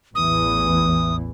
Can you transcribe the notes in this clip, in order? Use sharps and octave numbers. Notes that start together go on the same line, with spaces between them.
A1 E2 E3 D#6